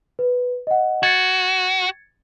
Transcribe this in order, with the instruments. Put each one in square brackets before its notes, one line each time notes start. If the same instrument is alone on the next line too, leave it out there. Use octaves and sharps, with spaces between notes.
[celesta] B4
D#5 F#5
[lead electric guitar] F#4 [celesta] G#6 A6 C#7